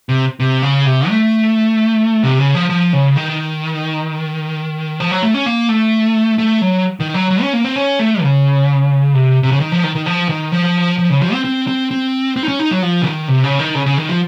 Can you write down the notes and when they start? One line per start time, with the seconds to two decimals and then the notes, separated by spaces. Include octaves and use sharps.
0.09 C3
0.40 C3
0.62 C#3
0.86 C3
1.09 A3
2.23 C3
2.39 C#3
2.55 F3
2.70 F3
2.93 C#3
3.16 D#3
5.00 F3
5.11 F#3
5.23 A3
5.34 C#4
5.46 A#3
5.69 A3
6.38 A3
6.61 F#3
7.00 D#3
7.14 F#3
7.31 F#3
7.41 C#4
7.53 A#3
7.65 C4
7.76 C#4
7.99 A3
8.22 C#3
9.14 C3
9.43 C3
9.52 C#3
9.60 D#3
9.72 F3
9.84 D#3
9.95 D#3
10.06 F3
10.29 D#3
10.52 F3
10.98 F3
11.10 C#3
11.21 F3
11.33 C4
11.44 C4
11.67 C4
11.91 C4
12.36 C4
12.43 D#4
12.48 C#4
12.59 D#4
12.71 F#3
12.82 F3
13.02 C#3
13.05 D#3
13.28 C3
13.44 C#3
13.59 D#3
13.75 C#3
13.86 C#3
13.98 D#3
14.09 F3